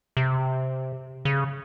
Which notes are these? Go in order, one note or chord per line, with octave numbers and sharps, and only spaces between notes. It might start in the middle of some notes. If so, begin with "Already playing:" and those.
C3
C#3